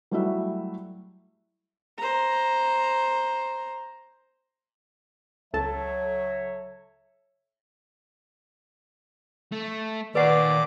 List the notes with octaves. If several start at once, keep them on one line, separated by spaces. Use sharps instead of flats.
F#3 G3 A3 E4 F#4 E5
C5 A#5
C#2 F#3 A4 C#5 E5 A5
A3
D#2 A#2 B4 D5 F#5 C#6 D6